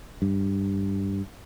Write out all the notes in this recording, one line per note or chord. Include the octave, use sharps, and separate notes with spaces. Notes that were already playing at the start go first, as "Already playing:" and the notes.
G2